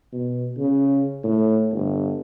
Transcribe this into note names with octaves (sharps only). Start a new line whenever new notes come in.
B2
C#3
A2
G1